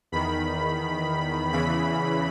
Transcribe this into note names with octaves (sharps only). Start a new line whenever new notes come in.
E2 D#3 B5
E2 C#3 E3 B5